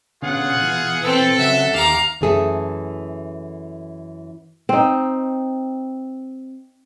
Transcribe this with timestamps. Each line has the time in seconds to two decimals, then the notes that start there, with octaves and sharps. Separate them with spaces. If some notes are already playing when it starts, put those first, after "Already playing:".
0.22 B2 D3 C#4 F4 G#4 F#5
0.61 B2 E3
1.02 C4 A4 B4
1.38 C#3 F#3 E5 F#5
1.74 D#2 G4 F5 A#5 D6
2.21 F#2 E3 A3 G#4 A4 E5
4.69 C4 D#4